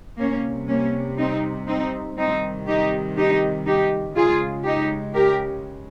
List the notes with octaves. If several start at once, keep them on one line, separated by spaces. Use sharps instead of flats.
C3 G3 A#3 C#4
A#3 C#4
C4 D#4
C4 D#4
C3 D#3 G3 C4 D#4
D#4 G4
D#4 G4
D#4 G4
C#3 G#3 F4 G#4
D#4 G4
G4 A#4